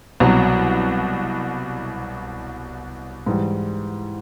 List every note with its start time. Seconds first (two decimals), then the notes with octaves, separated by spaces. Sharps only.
0.20 C2 B2 F#3
3.26 G#2 E3 G3